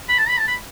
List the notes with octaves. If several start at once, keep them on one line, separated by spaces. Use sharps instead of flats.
B5
A5
B5
A5
B5